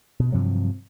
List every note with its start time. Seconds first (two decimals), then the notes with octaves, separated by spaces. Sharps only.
0.19 B2
0.32 G2 C3 F3 F#3